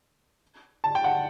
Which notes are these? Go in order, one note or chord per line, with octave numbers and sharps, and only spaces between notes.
A5
G5
F#5